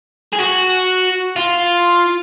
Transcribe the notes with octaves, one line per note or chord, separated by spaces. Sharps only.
G#4
F#4
F4